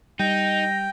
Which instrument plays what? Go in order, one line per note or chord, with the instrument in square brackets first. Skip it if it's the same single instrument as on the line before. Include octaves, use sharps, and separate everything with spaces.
[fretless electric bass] G3 [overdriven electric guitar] D#4 [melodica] G5 [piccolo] A#6